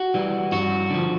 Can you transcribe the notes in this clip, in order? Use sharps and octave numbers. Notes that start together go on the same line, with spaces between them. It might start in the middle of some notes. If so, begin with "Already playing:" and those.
Already playing: F#4
E3 G3
G2 F#4
D3 F3